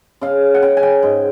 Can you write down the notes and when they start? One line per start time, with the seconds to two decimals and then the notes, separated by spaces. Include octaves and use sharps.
0.21 C#3 F5
0.54 F#5
0.62 C#3 G5
0.77 G#5
0.83 G5
1.03 G#2